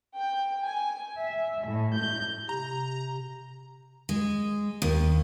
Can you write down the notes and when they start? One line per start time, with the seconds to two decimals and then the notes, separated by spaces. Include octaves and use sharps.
0.15 G5
0.64 G#5
1.17 E5
1.64 A2
1.95 G6
2.49 C3 A#5
4.09 G#3
4.82 D#2